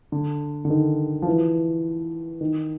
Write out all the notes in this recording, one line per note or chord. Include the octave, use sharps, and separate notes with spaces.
D3
D3
D#3
F3
E3
D#3